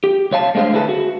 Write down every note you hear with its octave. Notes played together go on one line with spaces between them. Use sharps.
G4
C#2 C#5 F5 A5
G#3 A3 D4 G#4 C5 F5
D2 E4 G#4 A4 B4 A5
F#4